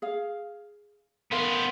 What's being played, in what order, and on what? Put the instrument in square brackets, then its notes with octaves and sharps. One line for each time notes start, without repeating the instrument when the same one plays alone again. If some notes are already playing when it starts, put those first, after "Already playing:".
[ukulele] G#4 F5
[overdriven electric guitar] B3 C5 [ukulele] A#4 F5